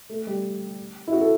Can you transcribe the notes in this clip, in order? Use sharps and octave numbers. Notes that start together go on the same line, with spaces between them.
A3
G3
E4
F#4
A4